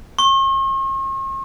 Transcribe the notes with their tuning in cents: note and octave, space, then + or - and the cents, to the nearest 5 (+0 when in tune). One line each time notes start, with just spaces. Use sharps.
C#6 -45